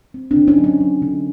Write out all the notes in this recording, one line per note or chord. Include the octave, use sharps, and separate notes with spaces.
C4
C4 D4
D3
C#4 D#4
F#3
C#4
F#3
D3